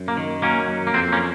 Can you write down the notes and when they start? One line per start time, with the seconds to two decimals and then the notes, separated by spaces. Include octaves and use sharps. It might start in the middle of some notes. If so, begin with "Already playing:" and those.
Already playing: F#2
0.08 A#3
0.17 D#3
0.42 F#3 A#3 C#4
0.68 F#2
0.87 A#3
0.94 F2 C4
1.12 A#3 C#4